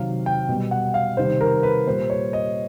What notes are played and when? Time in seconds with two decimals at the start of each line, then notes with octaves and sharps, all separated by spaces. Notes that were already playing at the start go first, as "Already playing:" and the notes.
Already playing: C3 D#3 F#3 F5
0.26 G5
0.48 B2 G3
0.71 F#5
0.94 F5
1.17 C3 D#3 G3 C5
1.41 A#4
1.63 B4
1.87 A#2 G3 C5
2.10 C#5
2.33 D#5